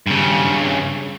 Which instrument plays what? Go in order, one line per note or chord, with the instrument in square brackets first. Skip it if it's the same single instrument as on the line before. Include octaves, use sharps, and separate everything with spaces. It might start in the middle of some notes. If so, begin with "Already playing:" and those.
[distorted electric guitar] G2 C#3